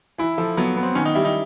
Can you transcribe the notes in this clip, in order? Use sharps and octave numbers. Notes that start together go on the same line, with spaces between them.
E3 E4
F3 A4
F#3 B3
B3
C4
D#3 C#4
D#4
G3 E4
D#4